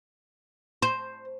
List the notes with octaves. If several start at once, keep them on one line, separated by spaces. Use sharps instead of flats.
C5